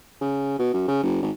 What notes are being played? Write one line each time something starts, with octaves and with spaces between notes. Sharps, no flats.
C#3
B2
F#2
C#3
F#1
G#1